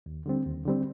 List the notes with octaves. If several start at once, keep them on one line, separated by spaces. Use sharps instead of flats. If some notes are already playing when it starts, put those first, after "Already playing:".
D#2
D3 G3 C4
D#2
D3 G3 C4